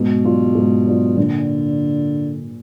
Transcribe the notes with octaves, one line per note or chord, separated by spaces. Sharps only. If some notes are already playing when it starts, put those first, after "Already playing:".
Already playing: G#2 B2
F#3 D4 F4
G#2
F#3 D4 F4
A#2 D3